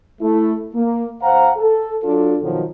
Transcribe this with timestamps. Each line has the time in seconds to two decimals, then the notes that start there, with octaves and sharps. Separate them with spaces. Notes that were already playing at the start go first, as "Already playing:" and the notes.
0.21 A3 E4
0.74 A#3
1.22 D2 C5 F5 F#5 A#5
1.57 A4
2.03 F#3 D4 F4 A4
2.42 B2 D#3 F3 F#3